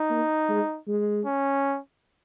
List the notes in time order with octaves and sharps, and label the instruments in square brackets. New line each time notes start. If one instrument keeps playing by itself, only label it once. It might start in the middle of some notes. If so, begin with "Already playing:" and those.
Already playing: [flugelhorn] D#4
[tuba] A#3
G#3
G#3
[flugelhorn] C#4